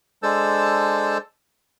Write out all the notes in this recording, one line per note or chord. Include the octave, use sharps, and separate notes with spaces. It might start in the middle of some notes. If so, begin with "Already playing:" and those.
G#3 D4 A4 C5 A5 E6